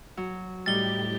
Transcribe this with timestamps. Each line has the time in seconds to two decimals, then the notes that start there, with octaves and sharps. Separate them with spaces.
0.17 F#3
0.66 A2 G3 D#4 G4 A6 G7